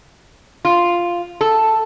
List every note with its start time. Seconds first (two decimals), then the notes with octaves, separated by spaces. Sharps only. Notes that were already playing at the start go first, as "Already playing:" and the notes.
0.65 F4
1.41 A4